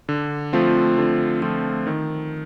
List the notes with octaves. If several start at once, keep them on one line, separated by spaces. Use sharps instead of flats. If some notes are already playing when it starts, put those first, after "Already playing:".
D3
F3 A3 C4 F4
D3
F3 A3 C4 F4
D#3